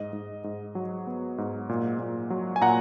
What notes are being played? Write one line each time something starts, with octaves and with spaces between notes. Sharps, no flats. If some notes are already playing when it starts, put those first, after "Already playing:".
Already playing: G#2 D#5
G#2
G#2
F#3
B3
G#2
A#2
A#2
F#3
G#5
A#2 F#5 A#5